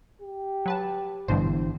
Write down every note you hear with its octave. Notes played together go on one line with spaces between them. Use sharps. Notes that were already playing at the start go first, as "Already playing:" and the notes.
G4
F#3 B4 A5
G#1 G2 B2 D3 E3 C5